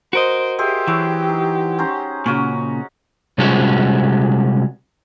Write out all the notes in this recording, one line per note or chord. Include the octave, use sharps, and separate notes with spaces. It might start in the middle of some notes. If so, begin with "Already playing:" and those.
F#4 A#4 C5 D#5
G4 G#4 C5 E5
E3 F#3
D#4
C#4 C5 A#5
A#2 C#3 C#4 F#4 F#5
C3 G3 G#3 C#4 F4 F#4